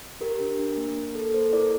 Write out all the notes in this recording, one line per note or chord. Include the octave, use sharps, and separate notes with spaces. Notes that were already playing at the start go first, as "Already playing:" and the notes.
G4 A#4
D4
D4
A#3
A#3
A4
A#3 A4 C5
E4 A#4 D5